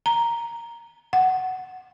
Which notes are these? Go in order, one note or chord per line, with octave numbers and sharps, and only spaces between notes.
A#5
F#5